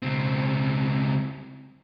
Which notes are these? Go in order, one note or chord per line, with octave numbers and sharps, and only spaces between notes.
C#2 C4